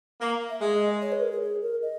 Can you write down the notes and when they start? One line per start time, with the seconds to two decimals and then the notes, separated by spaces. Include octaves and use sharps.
0.21 A#3
0.50 E5
0.61 G#3 D#5
1.02 C#5
1.12 B4
1.22 A#4
1.32 G#4
1.42 G#4
1.62 A#4
1.82 D#5